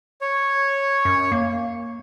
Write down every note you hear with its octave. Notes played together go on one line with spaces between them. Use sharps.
C#5
F#2
A#3